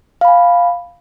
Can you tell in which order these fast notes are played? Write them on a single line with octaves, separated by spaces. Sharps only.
F5 B5 G#5